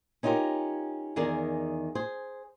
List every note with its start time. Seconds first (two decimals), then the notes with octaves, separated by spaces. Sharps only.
0.23 C#4 D#4 F4 G4 A#4
1.16 E2 D#3 G#4 A#4 D5
1.95 G#4 C5